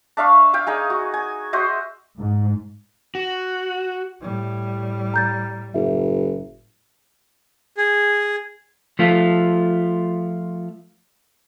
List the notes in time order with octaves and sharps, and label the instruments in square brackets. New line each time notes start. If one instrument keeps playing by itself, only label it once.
[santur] D4 E5 F5 C#6
E5 F5 G5
D#4 G#4 G#5
F#4
G#5
F#4 C5 D#5 E5
[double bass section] G#2
[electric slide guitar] F#4
[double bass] A2 G3
[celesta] A#5 G6 A6
[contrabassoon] F#1 [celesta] E5
[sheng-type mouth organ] G#4
[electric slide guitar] F3 A3 F4